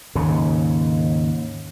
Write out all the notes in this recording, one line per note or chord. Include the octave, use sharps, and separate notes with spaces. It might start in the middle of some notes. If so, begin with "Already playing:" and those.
D#2 G#2 C#3